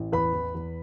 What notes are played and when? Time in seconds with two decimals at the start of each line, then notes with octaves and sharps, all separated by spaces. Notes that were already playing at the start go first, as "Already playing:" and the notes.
Already playing: A1
0.12 E2 B4 B5
0.34 E2
0.55 E2